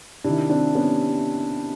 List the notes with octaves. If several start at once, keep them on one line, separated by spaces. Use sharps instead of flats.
C3 D#3 D4 E4
C4 D4
B3 C#4